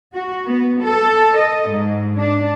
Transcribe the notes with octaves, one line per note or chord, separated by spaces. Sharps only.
F#4
B3
A4
D#5
G#2
D4